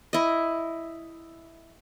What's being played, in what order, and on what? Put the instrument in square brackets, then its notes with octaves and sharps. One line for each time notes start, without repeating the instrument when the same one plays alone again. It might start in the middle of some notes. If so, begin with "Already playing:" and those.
[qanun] E4 D#5